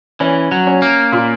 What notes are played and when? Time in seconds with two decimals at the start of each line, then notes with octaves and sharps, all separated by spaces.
0.20 E3 C#4
0.52 F#3
0.67 C#4
0.82 A#3
1.12 A#2